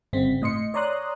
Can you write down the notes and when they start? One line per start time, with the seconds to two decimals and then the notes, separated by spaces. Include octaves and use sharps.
0.13 G1 C#3 C4 B6
0.42 A2 D#5 C6 C#7
0.74 C#5 D5 A#5 C6 D#6 F#6